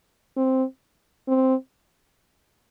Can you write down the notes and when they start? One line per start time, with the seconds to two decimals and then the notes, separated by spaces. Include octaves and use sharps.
0.37 C4
1.28 C4